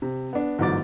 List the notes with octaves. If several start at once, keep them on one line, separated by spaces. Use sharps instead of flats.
C3
B3 D4
G1 G#2 E3 F#3 D6 A6